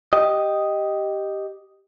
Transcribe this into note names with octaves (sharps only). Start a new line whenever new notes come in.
G4 D#5